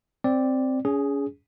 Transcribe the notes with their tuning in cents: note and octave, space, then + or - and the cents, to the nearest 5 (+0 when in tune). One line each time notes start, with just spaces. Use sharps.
C4 +0 D5 +0
C#4 +35 G#4 +0